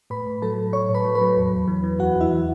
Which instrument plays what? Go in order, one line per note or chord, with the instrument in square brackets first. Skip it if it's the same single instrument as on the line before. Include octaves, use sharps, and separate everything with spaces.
[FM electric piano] A2 B4 B5
A2
F#3 A4 A5
F#3
A2 C#5 C#6
A2
B4 B5
F#3
B4 B5
F#3
E2
E2
E3
E3
E2 F#4 F#5
E2
E4 E5
E3